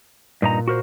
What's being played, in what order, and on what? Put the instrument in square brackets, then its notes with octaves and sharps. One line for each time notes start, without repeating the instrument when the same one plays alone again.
[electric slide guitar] G2 D#4 A#5 [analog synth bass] A#2
[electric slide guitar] F#4 A#4 C5